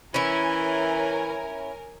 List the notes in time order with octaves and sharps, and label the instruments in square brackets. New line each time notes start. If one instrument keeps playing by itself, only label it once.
[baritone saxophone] E3 [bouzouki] C#4 E4 [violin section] A#4 C#5 G#5